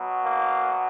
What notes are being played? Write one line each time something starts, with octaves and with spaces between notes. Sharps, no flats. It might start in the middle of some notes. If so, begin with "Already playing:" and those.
Already playing: B2 F#3
A#3